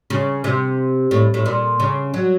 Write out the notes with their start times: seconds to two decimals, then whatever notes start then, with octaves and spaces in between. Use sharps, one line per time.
0.10 C#3
0.44 C3
1.11 A2
1.34 A2
1.46 A#2
1.80 C#3
2.14 F#3